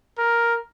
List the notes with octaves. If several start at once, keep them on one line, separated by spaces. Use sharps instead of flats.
A#4